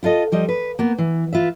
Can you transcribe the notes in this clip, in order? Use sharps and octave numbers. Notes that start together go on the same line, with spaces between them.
E4 F4 A4 D#5
F3 G3 D#5
B4
A#3 B3
E3
F4 B4 E5